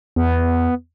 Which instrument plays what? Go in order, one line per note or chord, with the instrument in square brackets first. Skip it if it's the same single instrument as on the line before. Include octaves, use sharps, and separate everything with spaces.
[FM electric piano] E2 [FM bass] B3